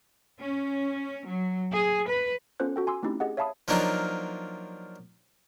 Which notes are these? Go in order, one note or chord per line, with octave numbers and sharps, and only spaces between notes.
C#4
F#3
G#4
B4
B3 C#4 F4 A4 C5 F#6
F#4 A4 G5
G#5 C6 D6 E6
A3 C4 C#4 D#4 E4 G4
G4 G#4 D#5 F#5
C#5 E5 F5 A5 B5 D#6
F3 F#3 A#3 D4 D#4 F4